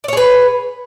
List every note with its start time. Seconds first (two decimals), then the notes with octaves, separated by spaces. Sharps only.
0.04 D5
0.08 C#5
0.13 G#4
0.17 B4